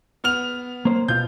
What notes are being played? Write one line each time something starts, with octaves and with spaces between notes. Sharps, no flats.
B3 F6 F7
A#3 C5
B2 F4 G6